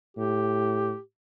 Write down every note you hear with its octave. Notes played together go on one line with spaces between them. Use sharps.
A2 G4